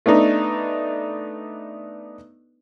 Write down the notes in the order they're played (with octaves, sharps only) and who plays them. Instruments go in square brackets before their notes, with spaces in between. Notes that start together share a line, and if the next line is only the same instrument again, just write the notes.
[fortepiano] A3 B3 D4 D#4